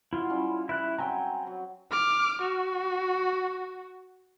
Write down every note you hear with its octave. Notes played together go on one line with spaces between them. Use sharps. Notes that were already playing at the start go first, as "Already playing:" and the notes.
F#3 E4 F4
G3 C#4
E4 B4 F#6
F#3 C4 G5 G#5 A#5
F#3
D6 F6
F#4